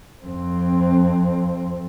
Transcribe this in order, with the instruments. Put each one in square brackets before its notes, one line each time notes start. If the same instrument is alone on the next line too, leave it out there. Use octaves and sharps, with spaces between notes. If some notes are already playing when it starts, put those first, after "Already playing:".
[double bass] F2 C4